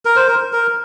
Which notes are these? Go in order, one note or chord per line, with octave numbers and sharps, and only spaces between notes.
A#4
C5
A#4
A#4